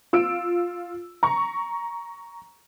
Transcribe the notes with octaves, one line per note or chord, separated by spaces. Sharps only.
F4 E6 D7
A#5 C#6